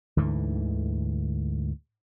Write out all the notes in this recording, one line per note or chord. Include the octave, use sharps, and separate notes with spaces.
D2 G#2 D3 E3